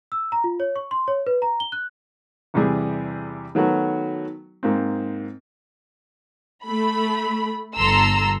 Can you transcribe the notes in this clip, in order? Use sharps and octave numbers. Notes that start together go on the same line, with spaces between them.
E6
A#5
F4
C#5
C#6
C6
C#5
B4
A#5
G7
F#6
E2 C3 E3 G3 G#4
D#3 F#3 A3 B3 F#4
G#2 A#3 C4
A3 B5
G1 A4 A#5 C6 E6